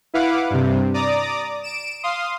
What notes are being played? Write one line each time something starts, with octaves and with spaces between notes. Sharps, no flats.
E4 B4 F5 F#5 D6
G2 C3
D5 A#5 D6 D#6
D7 E7
F5 C6 D#6